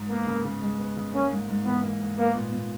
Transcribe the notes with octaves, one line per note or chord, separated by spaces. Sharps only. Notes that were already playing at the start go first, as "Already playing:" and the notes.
Already playing: G#2
A#3 B3
C#3
C#3
G#3
B3
C#3
A#3 C#4
G#2
G#2
E3 B3
A#3
G#2
A#3 B3
A#2
A#2